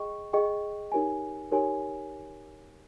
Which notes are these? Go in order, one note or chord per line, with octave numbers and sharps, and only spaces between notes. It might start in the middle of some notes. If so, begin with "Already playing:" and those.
Already playing: G#4 D#5 G5 C#6
G#4 D#5 G5 C#6
D#4 G4 A#4 C#5 G#5
D#4 G4 A#4 C#5 G#5